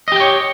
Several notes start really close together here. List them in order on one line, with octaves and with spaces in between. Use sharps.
D#5 G4 G5 C#5